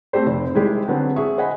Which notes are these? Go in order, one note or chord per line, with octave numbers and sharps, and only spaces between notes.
A3 C4 G4 C5
F1
D#3 G3 G#3 E4 G4 C5
D3 F#3 B3 C4
G#4 E5 C#6
C5 D#5 F#5 G#5 B5